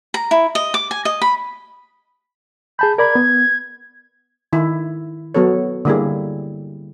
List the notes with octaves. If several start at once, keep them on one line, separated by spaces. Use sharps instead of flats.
A#5
E4
D#5
D6
G#5
D#5
B5
G#4 A5 B5 G6
A#4 D5 B5 G#6
B3
D#3 E4
F#3 B3 F#4 A4 C#5
D3 G3 A#3 E4 G4 G#4